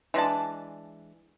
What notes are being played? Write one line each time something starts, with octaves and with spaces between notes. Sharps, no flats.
E3 G#3 D4 A5